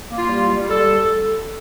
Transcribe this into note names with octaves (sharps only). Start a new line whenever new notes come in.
A#3
F4
G3
G3
G3 A4